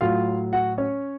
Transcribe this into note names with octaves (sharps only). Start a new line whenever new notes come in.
A2 F#3 F4 F5
F#4 F#5
C#4 C#5